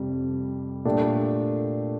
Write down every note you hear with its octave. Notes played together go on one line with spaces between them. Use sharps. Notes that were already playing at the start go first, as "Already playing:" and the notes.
Already playing: F2 C3 G3
A#2 A3 D4 G4